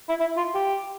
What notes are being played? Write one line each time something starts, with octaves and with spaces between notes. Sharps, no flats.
E4
E4
F4
G4